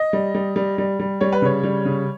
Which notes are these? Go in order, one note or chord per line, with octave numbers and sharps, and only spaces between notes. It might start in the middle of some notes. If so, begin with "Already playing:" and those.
Already playing: D#5
G3
G3
G3
G3
G3
G3 C#5
B4
C#3 C#5
G3
C#3